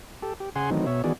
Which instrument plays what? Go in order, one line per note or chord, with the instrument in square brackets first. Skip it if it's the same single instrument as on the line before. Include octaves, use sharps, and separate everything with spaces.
[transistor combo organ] G4 A4
G4
C#3 G#4 F#5 G#5 C6
D#3 E3 F#3 A3 C4 D#4
B2 C#5 E5
D#3 E3 B3 F#4 G#4 D5